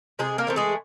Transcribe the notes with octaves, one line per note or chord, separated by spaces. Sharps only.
C3 G#3 G#4
A#3 A#4
E3 A3 C4
G#3 G#4